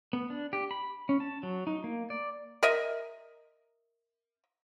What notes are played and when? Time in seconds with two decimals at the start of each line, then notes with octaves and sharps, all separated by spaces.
0.13 B3
0.30 D4
0.53 G4
0.71 B5
1.09 C#4
1.20 A5
1.43 F#3
1.67 D#4
1.84 A#3
2.10 D5
2.63 A#4 D#5 E5